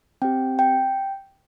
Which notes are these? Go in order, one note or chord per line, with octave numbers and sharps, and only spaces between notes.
C4 G4 G5
G5